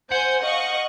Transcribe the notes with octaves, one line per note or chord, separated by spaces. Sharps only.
C5 F#5 G#5 G6
D#5 F5 C#6